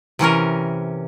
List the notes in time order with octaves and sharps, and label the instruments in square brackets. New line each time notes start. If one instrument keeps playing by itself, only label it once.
[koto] C3 E3 C#4 A#4